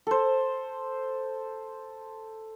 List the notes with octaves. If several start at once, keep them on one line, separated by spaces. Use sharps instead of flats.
A4 C5